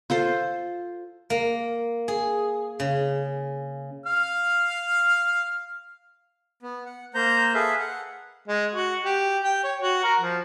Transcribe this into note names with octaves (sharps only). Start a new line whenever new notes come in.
F4 A4 C5
A#3
G#4
C#3
F5 F6
B3
F#5
A#3 C5 A#5 G6
G#4 A4 B4 E5 F5
F#5
G#3
F#4
G4
G5
C#5
F#4
A#4
F3